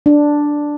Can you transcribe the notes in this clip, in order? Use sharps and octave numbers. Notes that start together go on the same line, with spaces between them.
D4